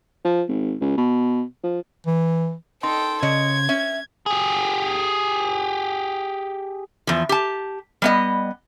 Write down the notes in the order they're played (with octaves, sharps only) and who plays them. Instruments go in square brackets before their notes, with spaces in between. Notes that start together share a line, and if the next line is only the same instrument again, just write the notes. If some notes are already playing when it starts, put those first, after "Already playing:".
[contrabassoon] F3
G#1
C#2
B2
F3
[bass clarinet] E3
[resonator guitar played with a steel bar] D#4 [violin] A4 G5 [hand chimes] C6
[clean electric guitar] C#3 [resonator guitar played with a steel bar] C#5 D#5 [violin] G#6
[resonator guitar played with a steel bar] C#4 [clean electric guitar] E5
[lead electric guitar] G4 G#4
[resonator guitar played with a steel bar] E2 F3
G4 A5
G3 B3 D#5